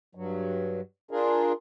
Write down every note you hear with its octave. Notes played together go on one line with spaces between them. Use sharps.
G2 F#3
D4 F4 G#4 A#4